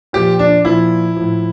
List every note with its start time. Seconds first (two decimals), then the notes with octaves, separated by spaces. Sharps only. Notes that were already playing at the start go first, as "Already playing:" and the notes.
0.13 A#2 F3 G4
0.39 D4
0.65 A#2 F3 E4
1.17 A2 F3